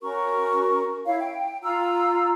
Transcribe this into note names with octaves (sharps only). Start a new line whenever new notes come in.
C#4 F#4 A#4 C#6
E4 C#5 F5
G5
F4 A#5 E6